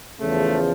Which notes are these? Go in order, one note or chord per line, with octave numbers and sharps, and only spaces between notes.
E2 C#3 F3 A3